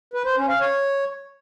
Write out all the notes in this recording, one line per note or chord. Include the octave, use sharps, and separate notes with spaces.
B4
C5
C#4
F5
C#5